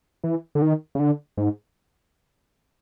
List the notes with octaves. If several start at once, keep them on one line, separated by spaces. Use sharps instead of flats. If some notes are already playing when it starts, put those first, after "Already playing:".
E3
D3
D#3
C#3
D3
G#2